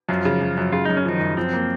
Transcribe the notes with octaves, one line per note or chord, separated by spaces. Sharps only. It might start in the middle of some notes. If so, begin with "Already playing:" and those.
F#2 F3 F4
C#3
F#2
F#2
C#3 F4
F#2 D#4
C#4
D#3 F3 D#4
F#2
F3 C4
A#3